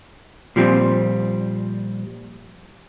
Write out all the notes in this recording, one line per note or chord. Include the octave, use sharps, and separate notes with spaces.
A#2 F3 G3 C4